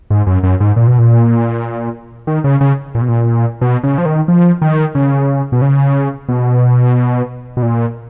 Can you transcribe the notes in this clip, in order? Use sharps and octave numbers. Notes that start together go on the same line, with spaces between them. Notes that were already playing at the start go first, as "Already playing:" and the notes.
G#2
F#2
F#2
G#2
A#2
B2
A#2
D#3
C#3
C#3
A#2
B2
A#2
B2
C#3
F3
D#3
F3
D#3
C#3
B2
C#3
B2
B2
A#2